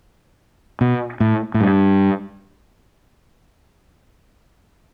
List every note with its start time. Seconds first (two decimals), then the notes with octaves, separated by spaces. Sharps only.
0.81 B2
1.20 A2
1.54 A2
1.61 G2